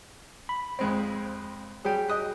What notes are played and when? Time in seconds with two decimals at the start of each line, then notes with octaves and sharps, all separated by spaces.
0.49 B5
0.79 F2 G#3 C4
1.85 F#3 G3 G#4 G5
2.09 D#5 D#6 F#6